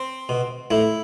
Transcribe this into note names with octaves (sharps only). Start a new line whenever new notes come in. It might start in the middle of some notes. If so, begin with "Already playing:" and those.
Already playing: C4
B2
A2 E4